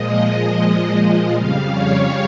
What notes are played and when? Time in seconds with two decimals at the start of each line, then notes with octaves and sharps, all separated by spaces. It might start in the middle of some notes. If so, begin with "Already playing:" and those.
Already playing: A#2 F3 G#3 D#5
0.96 D#5
1.33 F2 C#3 G3 F5
1.71 C#5